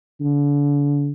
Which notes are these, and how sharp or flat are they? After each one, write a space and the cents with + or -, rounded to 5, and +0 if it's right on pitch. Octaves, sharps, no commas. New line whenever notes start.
D3 -35